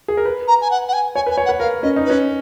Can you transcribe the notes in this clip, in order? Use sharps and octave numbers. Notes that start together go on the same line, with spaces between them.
G#4
A#4
B4
A#5
G#5
F#5
F#5
G#5
C#5 G#5
B4
G#5
C#5
F#5
B4
A#4 F5
C#4 D#5
D#4
C#4 B4